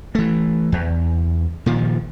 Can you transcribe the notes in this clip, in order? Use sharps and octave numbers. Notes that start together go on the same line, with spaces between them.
E3 A3
E2
A#2 D#3 F3